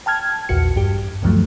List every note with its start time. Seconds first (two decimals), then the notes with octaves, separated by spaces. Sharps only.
0.06 G5 A5 F6 G#6
0.49 A#1 E2 F#4 C#7
0.76 G2 G4
1.22 D2 G2 D#3 F3 F#3 A3